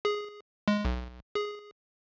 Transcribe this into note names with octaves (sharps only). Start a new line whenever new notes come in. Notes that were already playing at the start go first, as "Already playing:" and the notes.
G#4
G#3
B1
G#4